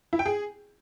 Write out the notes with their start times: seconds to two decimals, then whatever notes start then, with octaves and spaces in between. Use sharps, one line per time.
0.13 E4
0.19 G5
0.26 G#4